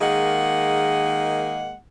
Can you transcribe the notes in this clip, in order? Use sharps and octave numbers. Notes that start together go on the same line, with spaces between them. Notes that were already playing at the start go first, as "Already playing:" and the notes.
D#3 G#3 A#3 G#4 F#5